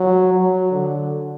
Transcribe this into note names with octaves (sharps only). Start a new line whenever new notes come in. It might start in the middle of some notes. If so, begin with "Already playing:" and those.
Already playing: F#3
F#3
D3